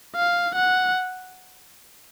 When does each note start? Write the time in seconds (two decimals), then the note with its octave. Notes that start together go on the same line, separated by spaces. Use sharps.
0.16 F5
0.56 F#5